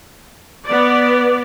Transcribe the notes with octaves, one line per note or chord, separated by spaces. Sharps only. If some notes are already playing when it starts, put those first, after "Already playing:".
B3 D5